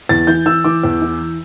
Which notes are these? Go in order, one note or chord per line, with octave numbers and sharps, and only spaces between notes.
E2 A6
E3 G6
E3 E6
E3 D6
E2
E3